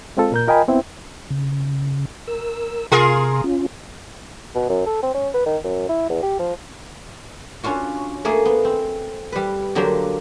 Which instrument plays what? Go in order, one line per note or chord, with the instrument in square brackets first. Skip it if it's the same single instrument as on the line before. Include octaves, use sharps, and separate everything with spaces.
[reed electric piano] G#3 C4 F4 A4
A#2 A#4 G6
F4 A#4 D#5 G5 G#5 B5
B3 C4 E4
[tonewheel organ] C#3
A#4 E6
[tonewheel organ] C3 [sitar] F4 G#4 A#4
[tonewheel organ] C#4 F4
[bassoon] B2
F#2
A4
C4
C#4
B4
D#3
F#2
E4
E2
G4
F3
[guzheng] C#4 D4 F4 F#4
A3 A#3 G#4 A4
B3
C4
G3 B4
D3 F#3 A#3 D4 G4 C5